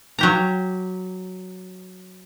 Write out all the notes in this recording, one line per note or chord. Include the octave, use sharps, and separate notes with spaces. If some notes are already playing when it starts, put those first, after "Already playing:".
F#3 G4 A#5